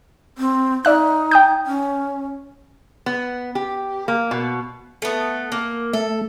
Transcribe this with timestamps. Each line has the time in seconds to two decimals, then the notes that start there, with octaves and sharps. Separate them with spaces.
0.38 C4
0.85 D#4 D5 E5 F#6
1.31 G5 D#6 G6
1.66 C#4
3.06 B3
3.55 G4
4.08 A#3
4.31 B2
5.02 A3 B3
5.52 A#3
5.93 A3 A4